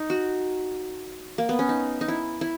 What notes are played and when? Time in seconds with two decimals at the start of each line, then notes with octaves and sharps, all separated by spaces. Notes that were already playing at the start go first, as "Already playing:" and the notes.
Already playing: D#4
0.10 F#4
1.38 A#3
1.49 B3
1.59 C#4
1.69 D#4
2.01 D#4
2.08 E4
2.41 E4